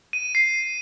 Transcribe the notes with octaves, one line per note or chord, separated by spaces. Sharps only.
D#7
C7